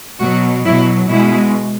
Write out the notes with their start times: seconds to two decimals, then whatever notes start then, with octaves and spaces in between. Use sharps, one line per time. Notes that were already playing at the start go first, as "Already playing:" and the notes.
0.19 B2 F#3 F#4
0.64 B2 F#3 E4
1.07 B2 G#3 E4